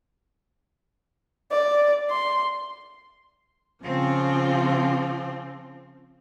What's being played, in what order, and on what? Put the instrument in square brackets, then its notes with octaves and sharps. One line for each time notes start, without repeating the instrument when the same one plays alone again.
[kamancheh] D5
C6
[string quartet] C#3 F3 F4 [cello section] C4